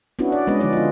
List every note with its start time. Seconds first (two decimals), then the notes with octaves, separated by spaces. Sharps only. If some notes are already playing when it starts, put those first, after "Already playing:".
0.19 B3 C#4 D4 E4 F#4
0.32 D5
0.47 G#3 B3 C#4 D4 B4 D#5
0.60 D3 F3 G#3 D#4 D5
0.73 B3 F4